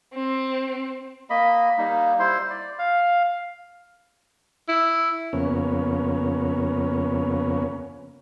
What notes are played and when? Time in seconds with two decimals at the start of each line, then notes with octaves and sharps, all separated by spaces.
0.14 C4
1.30 A#3 D#5 B5
1.78 G3 A#3 D#4
2.19 G3 E4 C5 C6
2.50 D5
2.79 F5
4.69 E4
5.33 F2 C#3 A#3 B3 C#4